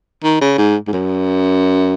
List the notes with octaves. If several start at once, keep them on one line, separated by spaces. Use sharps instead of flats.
D#3
C#3
G#2
G#2
F#2